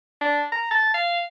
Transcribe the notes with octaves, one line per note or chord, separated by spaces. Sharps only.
D4
A#5
A5
F5